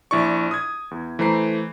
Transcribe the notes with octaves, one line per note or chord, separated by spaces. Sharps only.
A#1 E4 D5 C#6
D#6 G#6
E2
E3 A3 C5 A#5 C7